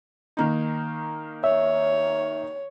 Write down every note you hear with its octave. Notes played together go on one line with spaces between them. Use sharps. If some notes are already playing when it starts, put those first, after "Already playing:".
D#3 A#3 D#4
C#5 E5